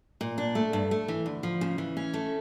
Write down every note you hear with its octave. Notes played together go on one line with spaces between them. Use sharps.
A#2
D4
A3
G2
A3
E3
D2
F3
C#3
E3
C#4
A3